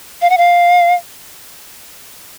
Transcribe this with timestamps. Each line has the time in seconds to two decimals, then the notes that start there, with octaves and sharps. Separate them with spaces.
0.22 F5
0.30 F#5
0.38 F5